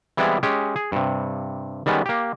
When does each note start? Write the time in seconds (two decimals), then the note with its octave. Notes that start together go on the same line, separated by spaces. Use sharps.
0.17 E3 G3 G#3 B3 C4 E4
0.43 G#3 C#4 G4
0.76 G#4
0.92 G2 C3
1.86 D#3 G3 G#3 B3 C#4
2.06 A#3 G4